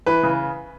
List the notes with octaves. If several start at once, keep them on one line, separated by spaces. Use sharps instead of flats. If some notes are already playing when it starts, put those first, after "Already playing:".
E3 B4 B5
C#3